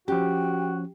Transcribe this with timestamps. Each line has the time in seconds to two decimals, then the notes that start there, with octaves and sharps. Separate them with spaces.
0.08 F3 C#4 F#4 G4 G5